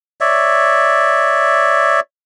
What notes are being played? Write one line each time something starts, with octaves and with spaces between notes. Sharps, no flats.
C#5 D5 E5